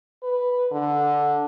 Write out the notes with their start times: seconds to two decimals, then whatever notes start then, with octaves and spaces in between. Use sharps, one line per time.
0.23 B4
0.72 D3